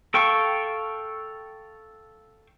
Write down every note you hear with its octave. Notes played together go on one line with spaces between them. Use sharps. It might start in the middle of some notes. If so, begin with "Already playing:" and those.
A4 F5 G5 C#6